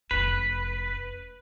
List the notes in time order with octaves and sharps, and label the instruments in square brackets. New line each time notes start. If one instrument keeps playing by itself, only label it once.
[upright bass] F1 C#4 [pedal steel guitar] B4